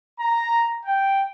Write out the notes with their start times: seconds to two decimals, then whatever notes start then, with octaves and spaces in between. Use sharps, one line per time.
0.20 A#5
0.85 G5